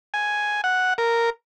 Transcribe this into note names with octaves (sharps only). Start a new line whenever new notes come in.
G#5
F#5
A#4